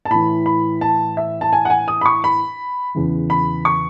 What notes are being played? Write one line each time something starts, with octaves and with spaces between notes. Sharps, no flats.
A5
A2 E3 B5
B5
A5
E5
A5
G#5
F#5
G#5
D#6
B5
C#6
B5
E2 C#3 E3
B5
C#6